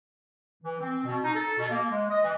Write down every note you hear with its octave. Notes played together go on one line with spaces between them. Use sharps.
E3
C4
B2
D#4
A4
B2
A#3
G#3
D#5
E3